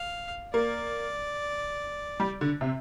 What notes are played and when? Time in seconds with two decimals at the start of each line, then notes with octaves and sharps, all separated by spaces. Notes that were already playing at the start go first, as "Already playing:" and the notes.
Already playing: F5
0.54 A#3 D5
2.20 G3
2.41 D3
2.61 C3